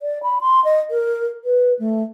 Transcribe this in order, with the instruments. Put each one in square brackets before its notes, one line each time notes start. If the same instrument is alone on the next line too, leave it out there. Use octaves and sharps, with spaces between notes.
[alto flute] D5
B5
C6
D#5
A#4
B4
A3